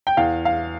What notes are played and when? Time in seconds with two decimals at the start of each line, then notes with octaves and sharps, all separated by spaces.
0.07 G5
0.17 E2 F5
0.45 F5